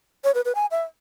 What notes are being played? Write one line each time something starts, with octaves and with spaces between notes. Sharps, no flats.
C#5
B4
B4
G#5
E5